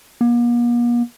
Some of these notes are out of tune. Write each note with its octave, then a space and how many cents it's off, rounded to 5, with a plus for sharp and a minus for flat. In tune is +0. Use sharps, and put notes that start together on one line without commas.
A#3 +45